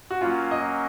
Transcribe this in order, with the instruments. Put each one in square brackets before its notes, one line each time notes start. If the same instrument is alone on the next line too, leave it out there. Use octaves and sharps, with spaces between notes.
[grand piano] F#4
[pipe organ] F#3 A#3 C#4 [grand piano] F4
[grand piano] D#5